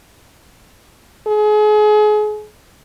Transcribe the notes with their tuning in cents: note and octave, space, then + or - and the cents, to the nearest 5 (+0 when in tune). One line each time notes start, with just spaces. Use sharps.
G#4 +35